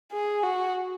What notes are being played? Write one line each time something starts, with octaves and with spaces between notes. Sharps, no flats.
G#4
F#4